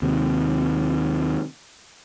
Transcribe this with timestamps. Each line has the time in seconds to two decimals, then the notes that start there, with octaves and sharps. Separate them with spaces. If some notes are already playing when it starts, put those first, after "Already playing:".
0.02 D#2 C3